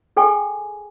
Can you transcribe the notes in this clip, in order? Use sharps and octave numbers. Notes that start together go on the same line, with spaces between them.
G#4 A4 G5 G#5 C#6